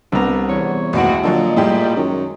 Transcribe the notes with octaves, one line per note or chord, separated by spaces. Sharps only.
C2 B3 D4 A#5
E2 C#5
A1 D#2 G#3 E4 F#4 D7
A#2 D3 F3 F#3 D#5
A2 G3 G#3 G4
F#2 D#3